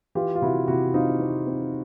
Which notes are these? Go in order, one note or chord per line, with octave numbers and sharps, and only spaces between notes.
E3 F4 G4
F4
C3 E4 F#4
C3 E4 F#4
C4 D#4 F4
C4
C4